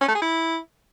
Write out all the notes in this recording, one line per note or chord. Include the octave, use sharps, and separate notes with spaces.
C#4
A3
G#4
E4